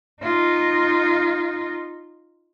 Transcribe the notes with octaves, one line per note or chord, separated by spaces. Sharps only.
D#4 F4